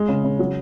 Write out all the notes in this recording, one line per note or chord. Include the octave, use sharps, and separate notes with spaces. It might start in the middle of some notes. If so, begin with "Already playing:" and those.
Already playing: G#3
C#3
C#3
F#3